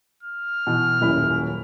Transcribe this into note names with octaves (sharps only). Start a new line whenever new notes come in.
F6
B2 E3
D#1 F#2 E4